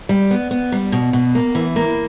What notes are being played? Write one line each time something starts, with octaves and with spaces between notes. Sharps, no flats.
G3
B3
B3
G3
B2
B2
A#3
E3
A#3